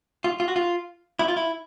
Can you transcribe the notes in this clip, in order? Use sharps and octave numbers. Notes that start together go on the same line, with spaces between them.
F4
F4
F#4
F4
E4
F4
E4